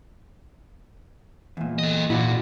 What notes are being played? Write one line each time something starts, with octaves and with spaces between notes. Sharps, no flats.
E2 A#2
A4 D#5
A#2 E4 F#4 D5